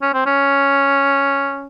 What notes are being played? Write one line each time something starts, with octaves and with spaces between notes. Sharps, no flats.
C#4
C4
C#4